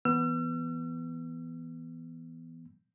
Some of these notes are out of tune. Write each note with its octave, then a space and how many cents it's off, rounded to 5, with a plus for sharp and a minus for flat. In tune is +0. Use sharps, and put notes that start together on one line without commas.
E3 +0 B3 +0 E6 +45